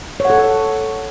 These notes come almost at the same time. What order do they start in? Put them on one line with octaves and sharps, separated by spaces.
C#5 F#5 A4